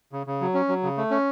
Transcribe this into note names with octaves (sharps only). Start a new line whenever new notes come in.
C#3
C#3
F#3
C#4
F#3
C#3
A3
C#4